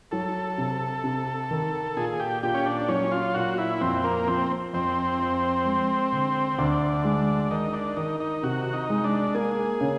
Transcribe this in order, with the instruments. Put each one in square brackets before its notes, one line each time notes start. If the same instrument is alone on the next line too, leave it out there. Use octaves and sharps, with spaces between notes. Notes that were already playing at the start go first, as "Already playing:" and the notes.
[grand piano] F#3 [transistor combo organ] A4
[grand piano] C3
C3
D#3
[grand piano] A#2 [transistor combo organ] G#4
[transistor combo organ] G4
[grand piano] A#2 [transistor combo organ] G4
[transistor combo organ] C#4
D4
[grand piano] F#3 [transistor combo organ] C#4
[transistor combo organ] F4
[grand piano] A#2 [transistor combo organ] F#4
[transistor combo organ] E4
[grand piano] F2 [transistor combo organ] C4
[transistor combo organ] A#3
[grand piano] F3 [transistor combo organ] C4
[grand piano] F2 [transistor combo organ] C4
[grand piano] F2
G#3
D3
[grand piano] D2 [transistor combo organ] D4
[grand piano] G#3
[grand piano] D#3 [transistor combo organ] D#4
[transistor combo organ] D4
[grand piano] D#3 [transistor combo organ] D#4
[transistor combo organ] D#4
[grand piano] C3 [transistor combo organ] F#4
[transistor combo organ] D#4
[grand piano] G#3
[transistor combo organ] D4
[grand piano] A#3 [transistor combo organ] G#4
[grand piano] C#3